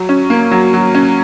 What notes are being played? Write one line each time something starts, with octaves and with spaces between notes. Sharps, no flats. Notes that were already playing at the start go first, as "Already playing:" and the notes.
Already playing: F#3
C#4
A#3
F#3
F#3
C#4